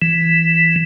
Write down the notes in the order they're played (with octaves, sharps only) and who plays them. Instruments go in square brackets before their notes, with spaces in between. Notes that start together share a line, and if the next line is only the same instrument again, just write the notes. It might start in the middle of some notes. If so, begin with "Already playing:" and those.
[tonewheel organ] E3